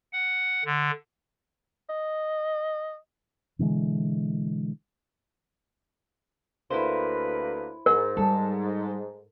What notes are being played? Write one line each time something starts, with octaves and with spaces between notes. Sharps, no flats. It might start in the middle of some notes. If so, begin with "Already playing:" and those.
F#5
D3
D#5
B2 D3 E3 G#3
D2 A#3 E4 B4 C5
G#2 A#4
G3 A4